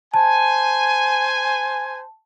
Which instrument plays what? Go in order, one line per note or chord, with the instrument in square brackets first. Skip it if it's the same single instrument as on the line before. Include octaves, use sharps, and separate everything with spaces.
[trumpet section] C5 G#5 [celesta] A5